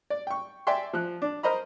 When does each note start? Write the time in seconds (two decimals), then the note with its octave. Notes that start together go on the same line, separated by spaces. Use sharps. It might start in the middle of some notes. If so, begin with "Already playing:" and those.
0.10 D5
0.27 G5 C#6
0.67 D5 E5 G5 G#5 C6
0.93 F3 F#6
1.22 D4
1.43 A#4 C5 D#5 A#5 B5